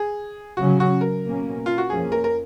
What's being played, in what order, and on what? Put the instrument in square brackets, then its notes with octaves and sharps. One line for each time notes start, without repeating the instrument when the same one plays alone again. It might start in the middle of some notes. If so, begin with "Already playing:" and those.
Already playing: [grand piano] G#4
[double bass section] C#3 F#3 C#4 [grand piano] F#4
[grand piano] F#4
A#4
[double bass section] B2 A#3 C#4
[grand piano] F4
F#4
[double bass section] F2 F3 A#3 C#4 [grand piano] G#4
[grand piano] A#4
A#4